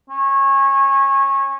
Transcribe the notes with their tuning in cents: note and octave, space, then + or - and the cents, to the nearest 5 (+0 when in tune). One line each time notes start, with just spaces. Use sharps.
C#4 -20